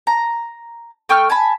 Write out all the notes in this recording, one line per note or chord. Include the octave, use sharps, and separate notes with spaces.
A#5
A3 G5 C#6 F6
G#5 A5 B5